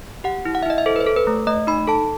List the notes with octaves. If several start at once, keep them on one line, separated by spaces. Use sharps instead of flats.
G4 F#5
E4
F#5
E5
E4 D#5
E5
A4 C5
B4
C5
A4
B4
A3
A3 D#5
D#4 B5
A4 A5